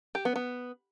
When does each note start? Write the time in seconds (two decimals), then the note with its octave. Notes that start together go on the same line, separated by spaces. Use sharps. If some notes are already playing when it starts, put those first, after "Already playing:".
0.15 G4
0.25 B3
0.36 B3